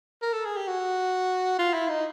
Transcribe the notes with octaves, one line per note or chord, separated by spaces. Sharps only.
A#4
A4
G#4
G4
F#4
F4
E4
D#4